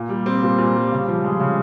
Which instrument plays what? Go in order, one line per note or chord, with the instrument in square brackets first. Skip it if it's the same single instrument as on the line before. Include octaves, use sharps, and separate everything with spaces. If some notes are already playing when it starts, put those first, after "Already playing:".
Already playing: [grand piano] A#2
G3
C4
A#2
A#2
G3
C#3
F3
G#3
C#3